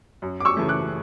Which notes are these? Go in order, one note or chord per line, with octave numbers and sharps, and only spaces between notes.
F#2
D6
C#6 E6
C#3 E3 A3
D6 F#6